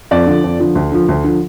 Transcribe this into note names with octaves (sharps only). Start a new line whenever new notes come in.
F2 D5
D3 F3
F2
D3 F3
D2
D3 F3
D2
D3 F3